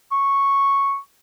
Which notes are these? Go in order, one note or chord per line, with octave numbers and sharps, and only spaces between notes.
C#6